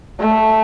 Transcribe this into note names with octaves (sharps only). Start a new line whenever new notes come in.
A3